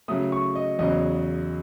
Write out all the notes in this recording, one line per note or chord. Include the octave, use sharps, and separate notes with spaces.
C#3 F#3 A3 D#6
C#6
D#5
E2 C#3 F#3 D#5